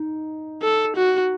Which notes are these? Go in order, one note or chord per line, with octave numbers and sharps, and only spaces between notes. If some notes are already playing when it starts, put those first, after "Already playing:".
Already playing: D#4
A4
F#4